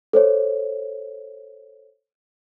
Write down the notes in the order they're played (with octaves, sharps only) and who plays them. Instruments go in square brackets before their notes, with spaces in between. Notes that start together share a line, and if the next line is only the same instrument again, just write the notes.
[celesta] A4 C5 C#5